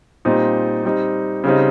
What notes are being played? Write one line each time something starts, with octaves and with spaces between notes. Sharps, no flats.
A#2 G3 C4 D#4
G3 C4 D#4
C#3 G3 C4 D#4